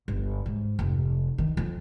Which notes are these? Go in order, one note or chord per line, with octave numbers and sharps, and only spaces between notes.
G1
G#2
F1
D#3
F2